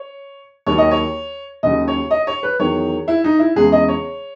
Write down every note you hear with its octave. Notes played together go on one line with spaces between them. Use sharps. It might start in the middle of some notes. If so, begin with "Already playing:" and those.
Already playing: C#5
D#2 D#3 F#3 C#5
D#5
C#5
D#2 C#3 F#3 D#5
C#5
D#5
C#5
B4
E2 D#3 F#3 C#5
E4
D#4
E4
E2 C#3 G#3 G#4
D#5
C#5